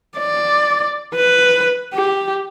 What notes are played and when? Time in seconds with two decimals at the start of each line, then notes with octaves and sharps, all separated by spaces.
0.18 D5
1.15 B4
1.94 G4